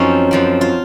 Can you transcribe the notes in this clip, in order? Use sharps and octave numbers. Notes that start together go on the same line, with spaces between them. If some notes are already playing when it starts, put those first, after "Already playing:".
Already playing: F#2 F3 C4 C#4 D#4
F#2 F3 C4
F4